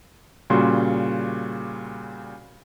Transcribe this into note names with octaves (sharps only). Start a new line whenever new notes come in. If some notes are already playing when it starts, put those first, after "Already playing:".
A#2 C#3 G3 F#4 C6